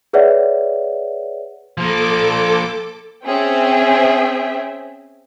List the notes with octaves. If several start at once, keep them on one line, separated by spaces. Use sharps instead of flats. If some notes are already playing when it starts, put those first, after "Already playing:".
G#4 B4 C#5 D5 E5 F#5
F3 A#3 A4 D6
C4 C#4 G#4 E5 G5